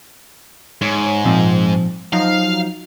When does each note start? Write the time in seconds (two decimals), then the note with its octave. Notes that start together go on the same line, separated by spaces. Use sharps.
0.82 G#2 C#5
1.25 A#2 F3 C4
2.13 F3 F#3 D#4 F5